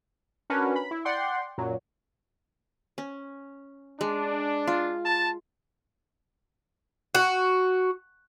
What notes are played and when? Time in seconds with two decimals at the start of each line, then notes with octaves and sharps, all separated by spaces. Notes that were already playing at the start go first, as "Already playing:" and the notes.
0.50 C#4 D4 F#4 A#4 B4
0.76 B5
0.91 E4
1.05 D5 F#5 G5 C6
1.58 F#2 A#2 F#3
2.98 C#4
4.01 G#3 D4
4.67 F4
5.06 A5
7.15 F#4